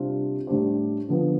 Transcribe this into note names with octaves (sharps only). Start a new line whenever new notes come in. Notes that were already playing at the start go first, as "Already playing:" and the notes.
Already playing: C3 G3 D4 F4 C5
A2 G3 D4 G4 C5
D3 F3 B3